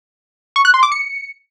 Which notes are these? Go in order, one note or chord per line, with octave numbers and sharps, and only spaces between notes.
C#6
F#6
C6
D6
C#7